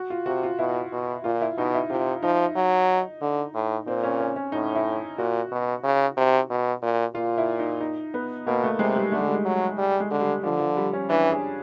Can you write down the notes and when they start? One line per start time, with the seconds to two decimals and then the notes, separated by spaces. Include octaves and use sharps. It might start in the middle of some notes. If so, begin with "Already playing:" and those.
Already playing: F#4
0.10 F4
0.26 C3 F#4
0.43 F4
0.59 B2 E4
0.92 B2
1.24 A#2 F4
1.41 E4
1.58 B2 D#4
1.74 E4
1.90 C3 F4
2.23 F3 D#4
2.56 F#3
3.21 D3
3.54 A2
3.87 A#2 C4
4.03 C#4
4.20 C#4
4.36 C#4
4.52 A2 D#4
4.75 E4
5.18 A#2 F#4
5.51 B2
5.84 C#3
6.17 C3
6.50 B2
6.82 A#2
7.15 A#2 F4
7.38 E4
7.59 D#4
7.81 D#4
8.14 B3
8.47 B2 A#3
8.64 A3
8.79 C3 G#3
8.96 G3
9.12 D3 A3
9.20 G#3
9.28 G3
9.34 G#3
9.45 F#3
9.78 G3
10.00 G#3
10.11 D3
10.21 G3
10.43 D3 F3
10.60 F3
10.77 G3
10.93 C#4
11.09 E3 D4
11.31 G#4